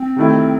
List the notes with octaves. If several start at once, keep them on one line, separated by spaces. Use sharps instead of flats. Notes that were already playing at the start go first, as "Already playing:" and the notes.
Already playing: C4
C3 D#3 A3 E4